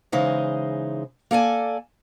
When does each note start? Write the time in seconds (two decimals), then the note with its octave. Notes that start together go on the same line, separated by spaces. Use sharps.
0.12 C#3 E3 G#3 D#4 C5
1.31 A#3 A4 D5 G#5